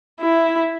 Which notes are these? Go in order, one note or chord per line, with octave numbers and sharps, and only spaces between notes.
E4